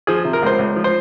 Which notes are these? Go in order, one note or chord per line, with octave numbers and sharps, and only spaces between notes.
F3 G#4
C3
A#4
C#2 C5
C#2
F3
C5